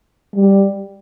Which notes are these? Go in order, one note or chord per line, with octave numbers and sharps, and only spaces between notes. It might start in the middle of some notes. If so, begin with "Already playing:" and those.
G3